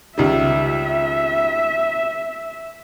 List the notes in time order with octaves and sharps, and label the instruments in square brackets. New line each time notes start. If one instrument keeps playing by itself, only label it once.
[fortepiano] C#2 D#3 G3 [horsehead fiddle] E5